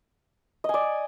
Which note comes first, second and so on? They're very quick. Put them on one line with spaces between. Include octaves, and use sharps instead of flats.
D#5 G#5 D5